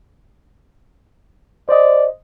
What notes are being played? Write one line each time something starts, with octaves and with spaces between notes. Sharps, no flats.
C5 D5 D#5